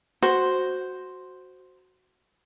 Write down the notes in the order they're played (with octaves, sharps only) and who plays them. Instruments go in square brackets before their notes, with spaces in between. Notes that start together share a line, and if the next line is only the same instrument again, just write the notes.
[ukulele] F#4 [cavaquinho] C5